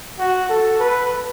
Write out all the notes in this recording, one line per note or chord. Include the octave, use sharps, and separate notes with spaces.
F#4
A4
B4